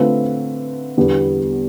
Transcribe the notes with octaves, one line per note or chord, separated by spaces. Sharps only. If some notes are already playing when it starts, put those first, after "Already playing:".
Already playing: D3 A3 C4 F4 B4
E2 D3 G3 B3